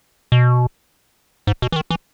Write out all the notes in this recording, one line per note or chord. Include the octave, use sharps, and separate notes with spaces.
B2
G#2
B2
E3
D#3
E3